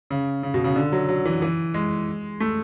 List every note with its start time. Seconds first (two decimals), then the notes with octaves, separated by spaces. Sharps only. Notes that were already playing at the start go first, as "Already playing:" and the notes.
0.10 C#3
0.43 C#3
0.54 B2
0.64 C#3
0.76 D3
0.92 F#3
1.09 F#3
1.25 E3
1.42 E3
1.74 G#3
2.40 A3